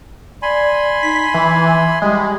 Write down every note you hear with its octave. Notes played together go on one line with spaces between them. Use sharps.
D5 G#5 B5 C6
D#4 B6
E3 E5
G3 G#3